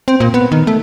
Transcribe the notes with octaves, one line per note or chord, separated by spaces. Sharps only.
C4
A#2
B3
D#3
A3